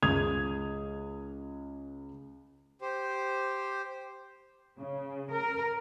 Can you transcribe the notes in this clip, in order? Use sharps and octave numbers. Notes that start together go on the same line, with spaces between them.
C#2 D#6 G#6 F7
G4 C5
C#3
A#4